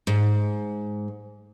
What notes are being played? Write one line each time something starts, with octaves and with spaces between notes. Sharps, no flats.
G#2